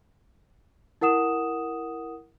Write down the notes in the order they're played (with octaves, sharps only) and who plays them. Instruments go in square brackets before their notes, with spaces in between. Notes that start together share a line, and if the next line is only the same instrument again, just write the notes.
[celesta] E4 A#4 F#5 D#6 E7